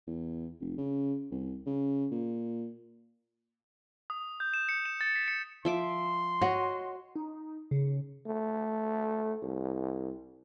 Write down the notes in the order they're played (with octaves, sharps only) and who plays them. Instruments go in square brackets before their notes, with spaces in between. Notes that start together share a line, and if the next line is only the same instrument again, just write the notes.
[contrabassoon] E2
F1
C#3
C2
C#3
A#2
[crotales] D#6
G6
E7
C#7
E7
A6
B6
C#7
[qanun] F3 E5 D6 [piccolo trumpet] C6
[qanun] F#4 [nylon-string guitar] C#5 D#5 F#5
[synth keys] D#4
C#3
[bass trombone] A3
C2